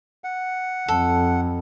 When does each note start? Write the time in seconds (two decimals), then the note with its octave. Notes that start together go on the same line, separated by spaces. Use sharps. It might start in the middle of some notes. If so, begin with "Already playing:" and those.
0.24 F#5
0.88 F2 A4